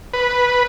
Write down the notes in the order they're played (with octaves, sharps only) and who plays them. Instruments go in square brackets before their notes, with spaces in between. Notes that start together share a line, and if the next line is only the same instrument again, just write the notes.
[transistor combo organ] B4